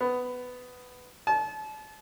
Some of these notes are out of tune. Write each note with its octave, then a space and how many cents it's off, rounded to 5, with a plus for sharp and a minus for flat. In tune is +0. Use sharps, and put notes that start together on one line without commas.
B3 +10
A5 -35